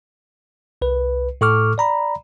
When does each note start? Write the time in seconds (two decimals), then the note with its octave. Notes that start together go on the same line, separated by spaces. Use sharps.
0.82 C2 B4
1.41 A2 A4 C#6 D6 F6
1.78 D5 A#5 B5